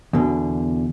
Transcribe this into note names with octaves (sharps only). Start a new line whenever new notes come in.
E2 B2 D3